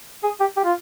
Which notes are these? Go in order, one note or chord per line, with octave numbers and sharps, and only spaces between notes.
G#4
G4
G4
F4